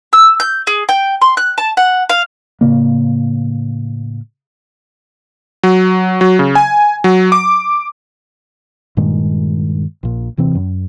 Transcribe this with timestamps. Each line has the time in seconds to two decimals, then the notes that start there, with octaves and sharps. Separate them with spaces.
0.13 E6
0.40 G6
0.67 G#4
0.89 G5
1.22 C6
1.37 F#6
1.58 A5
1.77 F#5
2.09 F5
2.61 A2 C#3 A#3
5.63 F#3
6.21 F#3
6.39 C#3
6.55 G#5
7.04 F#3
7.32 D6
8.97 G2 A#2 D#3 G#3
10.03 A#1 A#2
10.37 D#1 C3 E3 C4
10.55 F#2